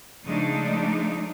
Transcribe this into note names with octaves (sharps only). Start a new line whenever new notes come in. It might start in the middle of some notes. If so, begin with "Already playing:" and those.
C#3 F3 G#3 A3 D4 D#4